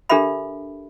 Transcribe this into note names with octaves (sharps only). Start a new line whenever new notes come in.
D4 G4 A4 A#4 E5 B5